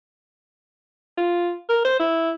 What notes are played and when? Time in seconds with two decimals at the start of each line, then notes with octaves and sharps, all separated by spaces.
1.17 F4
1.69 A#4
1.85 C5
1.99 E4